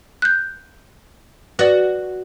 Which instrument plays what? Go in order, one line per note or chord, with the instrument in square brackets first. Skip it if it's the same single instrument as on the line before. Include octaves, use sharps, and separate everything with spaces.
[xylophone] F#6 G6
[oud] F#4 [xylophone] B4 D5